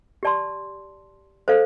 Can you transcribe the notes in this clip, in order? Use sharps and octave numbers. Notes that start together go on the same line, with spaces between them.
G4 D5 A5 C6
A4 C5 F5